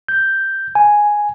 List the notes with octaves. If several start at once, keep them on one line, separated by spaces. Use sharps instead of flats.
G6
G#5